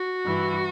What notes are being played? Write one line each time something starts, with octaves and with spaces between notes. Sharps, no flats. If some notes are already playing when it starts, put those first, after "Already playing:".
Already playing: F#4
G2 E3